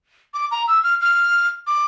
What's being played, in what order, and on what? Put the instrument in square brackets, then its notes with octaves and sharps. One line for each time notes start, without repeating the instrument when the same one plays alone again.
[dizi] D6
A#5
E6
F6
F6
D6